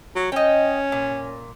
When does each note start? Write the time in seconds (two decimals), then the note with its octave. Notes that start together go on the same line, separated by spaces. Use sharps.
0.16 F#3
0.32 C#4 D#5 G5
0.92 A#2